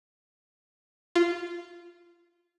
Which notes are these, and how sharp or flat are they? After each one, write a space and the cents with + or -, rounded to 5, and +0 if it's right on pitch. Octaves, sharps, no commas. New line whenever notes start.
F4 -15